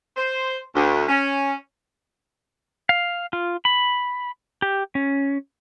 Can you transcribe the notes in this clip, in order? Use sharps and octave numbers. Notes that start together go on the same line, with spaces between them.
C5
D2
C#4
F5
F4
B5
G4
C#4